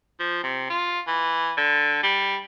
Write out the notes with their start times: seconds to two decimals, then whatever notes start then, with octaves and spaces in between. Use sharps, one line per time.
0.20 F3
0.43 C3
0.70 F4
1.08 E3
1.58 D3
2.04 G3